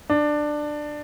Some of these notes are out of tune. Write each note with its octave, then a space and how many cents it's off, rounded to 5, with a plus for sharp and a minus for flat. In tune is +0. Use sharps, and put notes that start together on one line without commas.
D4 +15